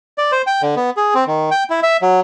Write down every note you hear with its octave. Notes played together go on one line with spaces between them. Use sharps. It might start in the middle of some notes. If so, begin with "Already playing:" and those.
D5
C5
G5
D3
B3
G#4
C4
D#3
G5
E4
E5
F#3